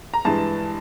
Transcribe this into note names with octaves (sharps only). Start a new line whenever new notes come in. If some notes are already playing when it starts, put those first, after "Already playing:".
A#5
G2 E3 G#3 A5